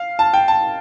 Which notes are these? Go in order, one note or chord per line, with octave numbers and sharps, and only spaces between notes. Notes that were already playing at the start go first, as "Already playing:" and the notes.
Already playing: F5
A5
G5
A5